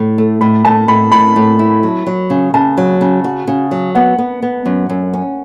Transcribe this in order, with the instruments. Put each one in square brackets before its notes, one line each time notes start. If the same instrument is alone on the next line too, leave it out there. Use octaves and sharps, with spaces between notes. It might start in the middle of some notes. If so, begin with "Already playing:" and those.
Already playing: [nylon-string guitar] A2
A3
[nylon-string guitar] A2 [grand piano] B5
[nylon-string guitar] A2 [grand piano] A5
[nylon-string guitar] A2 [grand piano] B5
[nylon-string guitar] A2 [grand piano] B5
[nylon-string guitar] A2
E4
F#3
F#3
C#3
[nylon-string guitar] C#3 [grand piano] A5
[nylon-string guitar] F#3
C#3
F#4
C#3
F#3
[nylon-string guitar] B3 [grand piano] F#5
[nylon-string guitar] B3
B3
F#2
F#2
C#4